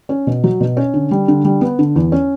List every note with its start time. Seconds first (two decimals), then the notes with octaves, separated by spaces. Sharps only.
0.09 C#4
0.27 B2
0.44 F#3
0.60 B2
0.77 C#4
0.94 D3
1.11 G3
1.28 D3
1.45 G3
1.61 B3
1.79 D3
1.96 E2
2.12 C#4